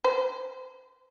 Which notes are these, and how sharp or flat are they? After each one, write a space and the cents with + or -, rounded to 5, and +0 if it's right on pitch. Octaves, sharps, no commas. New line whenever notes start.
C5 -20